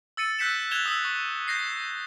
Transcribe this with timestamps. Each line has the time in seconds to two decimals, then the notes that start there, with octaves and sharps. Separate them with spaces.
0.17 E6 A6 C#7 D#7
0.39 E6 F#6 G6 B6 C#7 E7
0.71 F#6 G#6 E7 F7 G7
0.86 D#6 E6
1.05 C#6
1.48 G6 A#6 C7